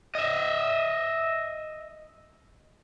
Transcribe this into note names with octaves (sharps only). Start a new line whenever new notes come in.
D#5 E5